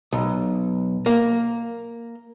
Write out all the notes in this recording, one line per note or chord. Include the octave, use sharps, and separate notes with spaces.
B1
A#3